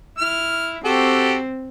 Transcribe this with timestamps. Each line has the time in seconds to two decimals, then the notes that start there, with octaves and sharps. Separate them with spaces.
0.19 E4 F6
0.85 C4 F#4 G4 A4